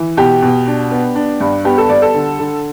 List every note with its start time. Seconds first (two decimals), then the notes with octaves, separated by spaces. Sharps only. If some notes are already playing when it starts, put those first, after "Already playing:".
Already playing: E3
0.17 B2 G4
0.42 B2
0.67 D4
0.91 B3
1.15 D4
1.40 G2
1.65 B3 G4
1.78 A4
1.89 G3 D5
2.02 A4
2.14 D3
2.39 D3